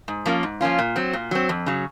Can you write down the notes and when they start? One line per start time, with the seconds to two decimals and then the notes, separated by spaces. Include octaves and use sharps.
0.08 G#2
0.26 F3 A#3 C#4 F4
0.43 G#2
0.61 F3 A#3 C#4 F4
0.79 A#2
0.96 F#3 C4
1.13 A#2
1.31 F#3 C4
1.49 F2
1.66 C#3 F#3